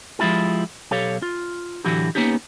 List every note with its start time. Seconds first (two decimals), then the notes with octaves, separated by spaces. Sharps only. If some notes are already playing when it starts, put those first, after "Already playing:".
0.19 F3 G#3 C#4 E4 F4 G4
0.91 B1 G4 A4 C#5 F5
1.22 F4
1.85 A2 D3 E3 F#3 F#4 G4
2.15 A#3 B3 C#4 D#4 G4